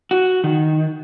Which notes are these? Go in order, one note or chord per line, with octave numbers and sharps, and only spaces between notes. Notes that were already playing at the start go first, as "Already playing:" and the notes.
F#4
D#3